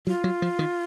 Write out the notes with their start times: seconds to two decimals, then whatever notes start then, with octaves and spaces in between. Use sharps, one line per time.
0.07 F#3 F4
0.24 F#3
0.42 F3
0.59 D#3